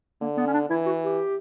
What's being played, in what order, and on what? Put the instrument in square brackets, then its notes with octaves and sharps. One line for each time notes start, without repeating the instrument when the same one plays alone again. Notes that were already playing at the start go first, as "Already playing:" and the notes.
[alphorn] D3 [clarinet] A#3
[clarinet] B3
C#4
D4
[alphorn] E3 [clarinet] E4
[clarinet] F#4
G4